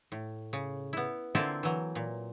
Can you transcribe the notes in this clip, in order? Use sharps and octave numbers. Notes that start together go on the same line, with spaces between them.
A2
C#3
B3 E4
D3 A#3 C4 E4 F4 A4
E3 F#3
A#2